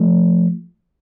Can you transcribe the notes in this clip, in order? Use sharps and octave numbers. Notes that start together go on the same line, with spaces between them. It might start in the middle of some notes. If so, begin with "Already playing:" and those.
Already playing: F3 A3